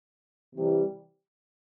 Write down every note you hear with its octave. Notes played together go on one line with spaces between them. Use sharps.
C3 E3 G3